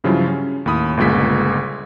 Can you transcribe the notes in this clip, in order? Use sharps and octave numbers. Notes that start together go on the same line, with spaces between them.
G2 C#3 F3 F#3 E4 F4
C#4
D#2 A2 B5 D#6
G1 C#2 A#2 G#3 B6